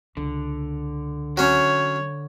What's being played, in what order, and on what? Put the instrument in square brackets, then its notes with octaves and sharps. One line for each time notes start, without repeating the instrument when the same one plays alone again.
[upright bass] C#2 [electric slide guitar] D3
[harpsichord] F#3 C#4 [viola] C#5